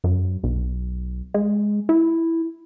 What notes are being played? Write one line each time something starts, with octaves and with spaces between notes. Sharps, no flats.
F#2
B1
G#3
E4